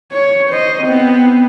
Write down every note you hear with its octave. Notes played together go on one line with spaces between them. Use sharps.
C#5
C5 D#5
B3 C4